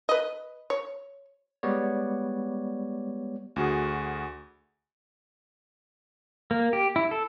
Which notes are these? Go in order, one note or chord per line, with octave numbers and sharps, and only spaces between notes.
B4 D#5
C#5
G3 G#3 B3 C#5 D5
D2 F#4 G#4
A#3
G4
E4
A4